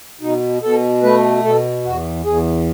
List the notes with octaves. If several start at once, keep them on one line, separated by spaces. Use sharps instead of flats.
B2 D#4
B2 A4
A3 B4
B2 A4
E2 F#4
E2 G#4